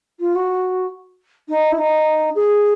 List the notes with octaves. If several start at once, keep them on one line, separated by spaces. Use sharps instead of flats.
F4
F#4
D#4
E4
D#4
G#4